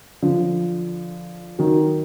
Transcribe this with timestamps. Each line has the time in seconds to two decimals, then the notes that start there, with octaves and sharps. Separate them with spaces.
0.23 D3 F3
1.59 D#3 F#3